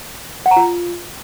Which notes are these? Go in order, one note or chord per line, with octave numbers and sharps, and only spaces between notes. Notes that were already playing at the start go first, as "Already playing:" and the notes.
F#5
A#5
F4